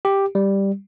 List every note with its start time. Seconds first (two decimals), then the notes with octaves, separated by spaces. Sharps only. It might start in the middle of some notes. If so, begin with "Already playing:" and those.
0.05 G4
0.35 G3